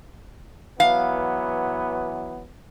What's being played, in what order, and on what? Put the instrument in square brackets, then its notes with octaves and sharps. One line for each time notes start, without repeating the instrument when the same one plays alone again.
[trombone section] E3 F#3 B3 [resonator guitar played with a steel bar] F5